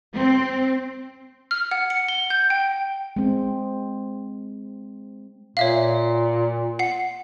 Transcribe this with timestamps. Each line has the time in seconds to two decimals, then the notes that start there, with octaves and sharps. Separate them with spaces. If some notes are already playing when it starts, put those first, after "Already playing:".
0.15 C4
1.51 F6
1.71 F#5
1.90 C#7
2.09 G7
2.30 G6
2.50 G5
3.16 G#3 C4
5.57 A#2 C#5 E5 F5
6.79 F#5 C7